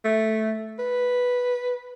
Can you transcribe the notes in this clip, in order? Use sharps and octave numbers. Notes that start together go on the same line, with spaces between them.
A3
B4